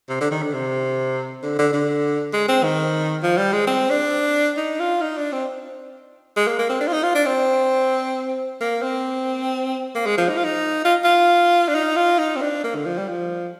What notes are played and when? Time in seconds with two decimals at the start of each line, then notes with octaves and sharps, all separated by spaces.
0.09 C3
0.21 D3
0.31 D#3
0.43 D3
0.54 C3
1.43 D3
1.59 D3
1.73 D3
2.33 G#3
2.49 C4
2.63 D#3
3.23 F3
3.37 G3
3.53 G#3
3.67 C4
3.90 D4
4.57 D#4
4.80 F4
5.02 D#4
5.17 D4
5.32 C4
6.36 G#3
6.47 A#3
6.59 A#3
6.69 C4
6.81 D4
6.87 F4
6.93 D#4
7.03 F4
7.15 D4
7.26 C4
8.61 A#3
8.82 C4
9.95 A#3
10.06 G#3
10.18 F3
10.29 D#4
10.37 F4
10.44 D#4
10.85 F4
11.04 F4
11.68 D4
11.75 D#4
11.96 F4
12.19 D#4
12.36 C4
12.41 D4
12.64 A#3
12.75 D3
12.86 F3
12.97 G3
13.08 F3